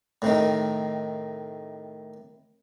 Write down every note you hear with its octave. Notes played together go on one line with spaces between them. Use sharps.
A2 C3 D#3